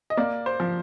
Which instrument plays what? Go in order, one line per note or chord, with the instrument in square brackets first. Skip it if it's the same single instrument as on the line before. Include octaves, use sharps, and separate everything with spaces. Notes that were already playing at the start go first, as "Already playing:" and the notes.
[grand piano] D#5
A#3 D5
C5
F3